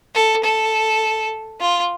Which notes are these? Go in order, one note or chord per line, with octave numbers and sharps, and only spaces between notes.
A4
A4
F4